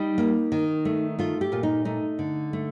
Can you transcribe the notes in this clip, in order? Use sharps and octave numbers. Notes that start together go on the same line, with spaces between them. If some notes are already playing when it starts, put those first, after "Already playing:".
Already playing: G3 D#4
A#3
D#3
A3
A3 F4
G4
A#2 F4
D#4
A3 D#4
D3
A3